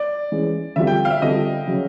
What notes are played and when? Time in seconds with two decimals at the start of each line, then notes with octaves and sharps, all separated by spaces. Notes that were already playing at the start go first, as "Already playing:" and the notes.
Already playing: D5
0.32 E3 G#3 C#4
0.76 D3 G3 C4 F4 A4 E5
0.87 G5
1.05 F5
1.10 E5
1.22 D3 G3 C4 F4 A4 D#5
1.67 C#3 F#3